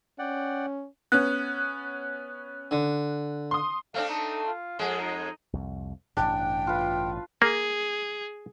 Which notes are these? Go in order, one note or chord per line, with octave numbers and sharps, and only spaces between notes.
C#4 D5 F#5 G5
B3 C#4 F#6
D3
C6 D#6
A3 C4 D4 F5
D#4
F4
F2 G#3 G#4
D#4
C2 F2
A1 G2 B2 D4 G5
F4 B4
A#3 G#4